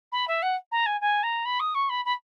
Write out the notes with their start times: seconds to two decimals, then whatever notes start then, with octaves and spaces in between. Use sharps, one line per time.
0.12 B5
0.28 E5
0.42 F#5
0.71 A#5
0.86 G#5
1.01 G#5
1.23 A#5
1.45 B5
1.60 D#6
1.75 C#6
1.89 B5
2.05 B5